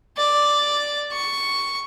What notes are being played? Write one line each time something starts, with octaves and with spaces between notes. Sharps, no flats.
D5
C#6